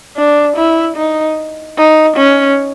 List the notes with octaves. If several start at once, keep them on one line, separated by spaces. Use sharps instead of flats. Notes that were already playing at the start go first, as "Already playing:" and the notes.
D4
E4
D#4
D#4
C#4